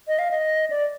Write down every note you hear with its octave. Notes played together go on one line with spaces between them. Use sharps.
D#5
F5
D#5
D5